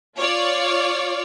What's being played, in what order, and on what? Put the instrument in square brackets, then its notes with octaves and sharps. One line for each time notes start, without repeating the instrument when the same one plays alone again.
[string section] F4 C#5 D5